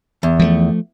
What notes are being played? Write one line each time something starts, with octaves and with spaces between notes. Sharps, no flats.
E2
F3 G3 A3